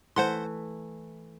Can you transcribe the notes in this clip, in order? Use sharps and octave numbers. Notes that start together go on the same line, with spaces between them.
E3 A3 C5 F#5 C6